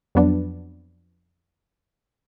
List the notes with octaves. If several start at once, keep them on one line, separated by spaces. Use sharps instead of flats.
F2 F#3 B3 D4